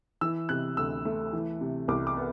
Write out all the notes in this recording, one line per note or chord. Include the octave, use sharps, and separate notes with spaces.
E3 E6
C3 F#6
D2 E6
A3
E3
C3
C2 D6
D6
B3